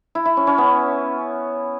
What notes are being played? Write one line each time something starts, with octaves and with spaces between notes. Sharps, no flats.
E4
E4
C#4
C#4
B3